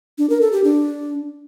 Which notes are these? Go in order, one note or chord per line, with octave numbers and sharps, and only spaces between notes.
D4
A#4
A4
G4
D4